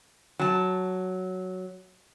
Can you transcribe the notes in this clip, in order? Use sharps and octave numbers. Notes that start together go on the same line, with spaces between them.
F#3 A5